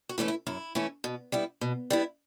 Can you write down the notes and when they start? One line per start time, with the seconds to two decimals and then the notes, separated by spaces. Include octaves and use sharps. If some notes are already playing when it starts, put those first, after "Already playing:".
0.09 F#4
0.18 E3 A3 C#4 E4
0.28 E4
0.47 F#2 E4
0.75 E3 A3 C#4 E4
1.04 B2
1.32 G3 B3 E4
1.61 B2
1.90 G3 B3 E4